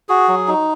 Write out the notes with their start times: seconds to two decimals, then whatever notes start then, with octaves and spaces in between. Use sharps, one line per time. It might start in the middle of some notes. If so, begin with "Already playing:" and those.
0.09 F#4 G#4
0.28 F#3
0.48 D#4